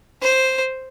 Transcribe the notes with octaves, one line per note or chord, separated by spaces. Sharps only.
C5